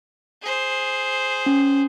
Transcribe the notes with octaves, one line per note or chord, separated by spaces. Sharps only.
G#4 C5
C#4